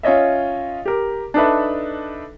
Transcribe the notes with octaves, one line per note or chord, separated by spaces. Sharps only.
C#4 F4 C#5 D#5 E5
G4 A#4
D4 D#4 A4 B4 E5